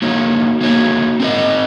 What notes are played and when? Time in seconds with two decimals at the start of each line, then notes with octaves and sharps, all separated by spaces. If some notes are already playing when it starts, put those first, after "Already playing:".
0.02 A#3 D#4 F#4 C#5
0.61 A#3 D#4 F#4 C#5
1.20 C4 D#4 A#4 D#5